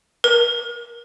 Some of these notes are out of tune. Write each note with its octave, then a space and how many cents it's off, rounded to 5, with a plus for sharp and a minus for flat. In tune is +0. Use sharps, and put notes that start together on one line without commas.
A#4 +30